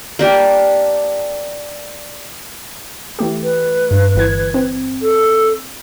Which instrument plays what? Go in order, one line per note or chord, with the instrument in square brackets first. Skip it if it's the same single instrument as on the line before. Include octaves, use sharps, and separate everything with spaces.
[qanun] A#3 D4 G4
[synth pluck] E3 A3 G4
[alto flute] B4
[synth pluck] G2
G1 E3 G#6
C4
[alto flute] A4